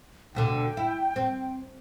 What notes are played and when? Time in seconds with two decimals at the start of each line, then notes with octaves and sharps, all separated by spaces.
0.35 D2 B2 D3 G5
0.77 E4
1.16 C4